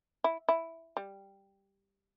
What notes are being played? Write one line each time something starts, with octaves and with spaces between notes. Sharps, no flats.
E4
E4
G3